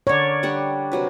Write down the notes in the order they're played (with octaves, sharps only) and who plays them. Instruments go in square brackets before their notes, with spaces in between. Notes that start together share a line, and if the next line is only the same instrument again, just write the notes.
[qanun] D3 A#4 [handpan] C#5 D5
[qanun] G3 D4 F#5
C3 F#3 B4